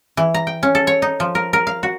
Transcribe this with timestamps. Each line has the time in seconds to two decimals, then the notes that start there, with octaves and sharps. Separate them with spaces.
0.17 E3
0.34 A#5
0.47 G5
0.63 C#4
0.75 A4
0.87 C#5
1.02 D#4
1.20 F3
1.35 A#4
1.53 A#4
1.67 F5
1.83 F#4